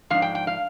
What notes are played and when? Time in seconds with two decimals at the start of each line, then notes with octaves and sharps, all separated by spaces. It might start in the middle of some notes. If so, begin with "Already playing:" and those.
0.10 G#2 F3 D4 F5
0.22 G5
0.35 G5
0.47 F5